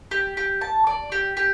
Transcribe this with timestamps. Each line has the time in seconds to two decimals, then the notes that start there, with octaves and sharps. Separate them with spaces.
0.11 G4
0.37 G4
0.61 A5
0.87 D5
1.12 G4
1.37 G4